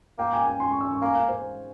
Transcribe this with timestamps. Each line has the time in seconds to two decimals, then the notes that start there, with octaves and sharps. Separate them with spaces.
0.18 A#3 G5
0.33 G#5
0.47 G#5
0.60 C6
0.71 C#6
0.81 E6
0.91 C#6
1.02 A#3 G#5
1.15 F5
1.29 C5